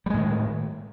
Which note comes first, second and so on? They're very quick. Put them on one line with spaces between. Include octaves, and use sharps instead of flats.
G3 G#3 A2 D#3